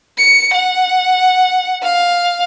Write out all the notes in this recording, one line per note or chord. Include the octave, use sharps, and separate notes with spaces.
C#7
F#5
F5